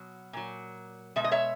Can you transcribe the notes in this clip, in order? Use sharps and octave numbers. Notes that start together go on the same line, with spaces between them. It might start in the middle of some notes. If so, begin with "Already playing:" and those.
Already playing: B2 F#3
A#2 F#3
B2 G#3 E5
D#5
C#5 E5